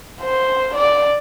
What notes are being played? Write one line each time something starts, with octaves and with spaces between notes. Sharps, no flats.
C5
D5